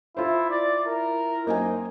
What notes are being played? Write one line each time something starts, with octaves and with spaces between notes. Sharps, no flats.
E4 F4 A4 C5
E4 D5
A#4
F#2 A#3 C4 D#4 D#5 G#5